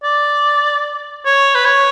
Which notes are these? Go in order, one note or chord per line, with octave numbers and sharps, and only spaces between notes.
D5
C#5
B4
C#5